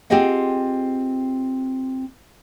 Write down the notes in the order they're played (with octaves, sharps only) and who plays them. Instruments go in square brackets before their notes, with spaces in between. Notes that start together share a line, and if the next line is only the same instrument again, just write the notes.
[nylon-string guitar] C4 F4 G4 G#4 D#5 F#5